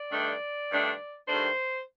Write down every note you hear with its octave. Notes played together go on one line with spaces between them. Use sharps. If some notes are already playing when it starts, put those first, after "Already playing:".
Already playing: D5
G2 D#3 A3 D4
G2 D#3 A3 D4
G2 D#3 A3 D4 C5